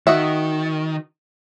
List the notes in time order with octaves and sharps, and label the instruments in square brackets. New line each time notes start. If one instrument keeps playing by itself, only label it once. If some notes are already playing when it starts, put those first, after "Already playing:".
[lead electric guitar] D#3 [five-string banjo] F#4 D#5 E5